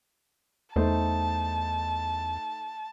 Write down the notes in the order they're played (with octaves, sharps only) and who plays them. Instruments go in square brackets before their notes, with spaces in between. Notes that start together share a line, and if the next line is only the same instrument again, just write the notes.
[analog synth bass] E2 [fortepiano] A3 D#4 C5 [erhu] A5